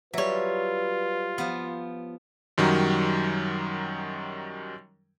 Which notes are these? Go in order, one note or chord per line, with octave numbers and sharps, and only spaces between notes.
F#3 G3 F4 B4 C#5 E5
F3 B3
F#2 D#3 F#3 G3